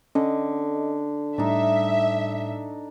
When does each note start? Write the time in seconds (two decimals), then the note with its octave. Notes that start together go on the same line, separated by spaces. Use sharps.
0.15 D3 C#4 A4 D#5
1.38 A2 G3 D4 D#4 E5